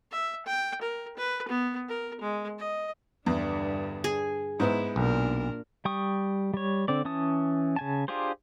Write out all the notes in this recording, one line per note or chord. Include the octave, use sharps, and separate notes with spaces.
E5
G5
A#4
B4
B3
A#4
G#3
D#5
E2 G2 D3
G#4
G#2 B3 E4
B1 A#2 D4 A#4
G3 G5 C#6 D#6
G3 C#5
D3 C4 D5
E3 C#4 A5 D#6
C#3 G#5 A5
D4 F4 G4 G#4 C5